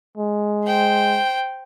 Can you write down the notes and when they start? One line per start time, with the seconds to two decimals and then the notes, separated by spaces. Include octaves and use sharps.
0.17 G#3
0.65 C5 G5